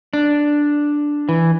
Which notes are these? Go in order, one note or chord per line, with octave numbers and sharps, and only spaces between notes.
D4
E3